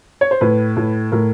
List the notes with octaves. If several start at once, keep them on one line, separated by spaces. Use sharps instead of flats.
C#5
C5
A2 B4
A2
A2 A#4